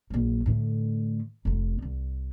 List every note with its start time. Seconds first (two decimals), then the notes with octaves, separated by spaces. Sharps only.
0.10 A#1 F#3
0.46 A2 D3
1.45 F1 D#4
1.82 C2